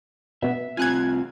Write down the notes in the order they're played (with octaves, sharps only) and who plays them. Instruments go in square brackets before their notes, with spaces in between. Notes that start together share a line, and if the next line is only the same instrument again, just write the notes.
[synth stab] B2 B3 [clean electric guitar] E5
[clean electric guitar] C2 C4 F4 [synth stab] G#5 F#6 G#6